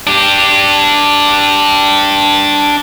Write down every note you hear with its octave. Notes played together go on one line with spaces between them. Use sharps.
D4 G4